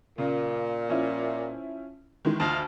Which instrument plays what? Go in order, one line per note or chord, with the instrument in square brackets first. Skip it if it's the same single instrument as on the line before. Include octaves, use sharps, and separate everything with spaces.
[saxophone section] A#2 [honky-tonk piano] C#3
[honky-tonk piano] F3 C#4 E4
D#3 E3 G#3
[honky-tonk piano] D2 A5 [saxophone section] F4 D#5 F5